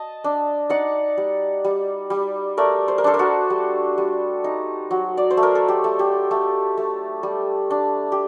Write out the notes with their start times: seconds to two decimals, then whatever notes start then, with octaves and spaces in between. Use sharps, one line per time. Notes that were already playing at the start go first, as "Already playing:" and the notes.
Already playing: D#5 A5
0.24 D4
0.70 D#4 D5 F#5
1.18 G3
1.64 G3
2.10 G3
2.57 A3 A#4 D5
2.88 C5
2.98 A#4
3.04 D4 A4 C5
3.14 A#4
3.19 F#4 A4
3.50 G3
3.98 G3
4.44 D#4
4.91 F#3
5.17 D5
5.31 C5
5.37 A3
5.43 A#4
5.55 A4
5.68 G4
5.84 A3
5.99 G4
6.31 A3
6.78 A3
7.23 G3
7.70 D4
8.12 G4